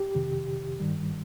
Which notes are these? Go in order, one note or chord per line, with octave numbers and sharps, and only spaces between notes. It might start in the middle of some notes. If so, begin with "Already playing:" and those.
Already playing: G4
F2 C3 D#3
G2 D#3 G3